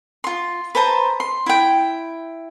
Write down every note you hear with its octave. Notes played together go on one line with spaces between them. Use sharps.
F4 C6
B4 C5 A5 A#5
C6
E4 G5